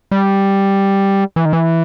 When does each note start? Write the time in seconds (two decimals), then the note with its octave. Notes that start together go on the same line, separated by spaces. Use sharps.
0.11 G3
1.36 E3
1.45 D#3
1.53 E3